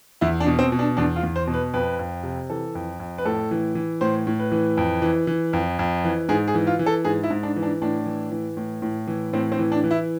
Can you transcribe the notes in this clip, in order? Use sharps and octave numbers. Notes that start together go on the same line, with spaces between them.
E2 E4
D4
B2
C4
B2
D4
E2 D4
F4
E2
C5
B2
B4
F2 B4
F2
C3
E3 A4
F2
F2
B4
A2 A4
E3
E3
A2 C5
A2
B4
E3
F2
E3
E3
F2
F2
E3
G#2 G#4
G#4
E3
F4
E3
A4
G#2 G#4
E4
G#2
D4
E3
D4
A2 D4
E3
E3
A2
A2
E3
A2 C4
C4
E3
D4
E3
E4